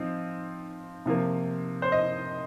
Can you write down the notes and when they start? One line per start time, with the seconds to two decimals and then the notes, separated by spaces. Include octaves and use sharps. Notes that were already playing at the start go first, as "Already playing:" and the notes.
Already playing: F3 C4 D#4
1.06 C3 F3 A#3
1.82 C5
1.92 D#5